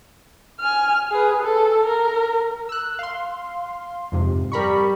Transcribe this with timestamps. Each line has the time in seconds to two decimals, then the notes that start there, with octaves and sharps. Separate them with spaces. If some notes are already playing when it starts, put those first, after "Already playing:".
0.60 G#5 F6
1.11 G#4 B4
1.42 A4
1.85 A#4
2.69 E6 F#6
2.99 F5 C6
4.12 F2 G#2 C3
4.52 G3 A#4 B5 C#6